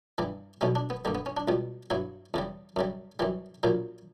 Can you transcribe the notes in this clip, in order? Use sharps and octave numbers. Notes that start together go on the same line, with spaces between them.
G2 E3 G3
B1 B2 G3 C#4
D4
B3
G2 D3 G3 A#3
B3
C#4
D4
C#2 B2 G3
G2 F#3 E4
E2 C#3 G3
F#2 C#3 G3
F#2 E3 G3
A#1 A#2 F#3